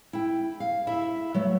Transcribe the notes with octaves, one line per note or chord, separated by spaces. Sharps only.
E4 G5
F5
E4 E5
F#3 A3